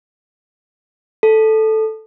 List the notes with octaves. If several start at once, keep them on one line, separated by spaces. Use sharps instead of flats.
A4